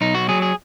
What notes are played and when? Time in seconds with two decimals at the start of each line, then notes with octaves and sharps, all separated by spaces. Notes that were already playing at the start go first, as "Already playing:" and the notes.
0.01 B1 D#4
0.15 F#4
0.29 F#3 G#4
0.42 G#4